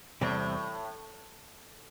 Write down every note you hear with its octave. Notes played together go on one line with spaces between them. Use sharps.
E2 A2 C3 G3 C4